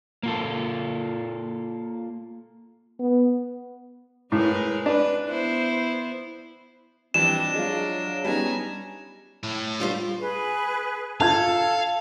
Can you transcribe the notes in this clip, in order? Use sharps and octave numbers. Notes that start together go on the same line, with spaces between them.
A#3 F4 A4
B3
A2 G#3 A#4 B4
D4 B4
B3 E4 C5
E3 F3 G3 C4 D4 D#5 E7
F#3 G#3 F4
G3 B3 C#4 D#4 G#5 A#5
A2
G3 F4 C5
G#4 B4
A4 F5 A5 G#6